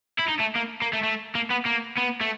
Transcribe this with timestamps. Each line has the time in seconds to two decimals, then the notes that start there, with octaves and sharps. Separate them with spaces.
0.19 E4
0.29 D#4
0.40 A3
0.56 A#3
0.82 A#3
0.93 A3
1.03 A3
1.35 A#3
1.51 B3
1.66 A#3
1.98 B3
2.21 A3